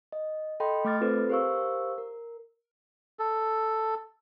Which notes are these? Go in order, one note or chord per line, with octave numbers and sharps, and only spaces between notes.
D#5
A4 D#5 G5 B5 C6
A3 D6 F6 A6
C4 F4 A4 B4 C5
G4 A#4 C5 F5 C#6 E6
A#4
A4